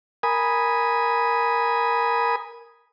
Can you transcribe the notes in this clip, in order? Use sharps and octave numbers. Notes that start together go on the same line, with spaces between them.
A#4 G#5 B5 D#6